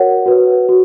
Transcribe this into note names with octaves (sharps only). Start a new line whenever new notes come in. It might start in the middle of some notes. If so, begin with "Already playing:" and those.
Already playing: F#4 A#4 C#5 F#5
F#4 B4
F#4